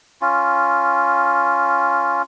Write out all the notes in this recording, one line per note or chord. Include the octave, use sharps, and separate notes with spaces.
C#4 F4